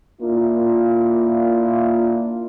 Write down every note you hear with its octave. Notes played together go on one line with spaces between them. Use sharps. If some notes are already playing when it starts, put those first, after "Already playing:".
A#3 D4 E4 F4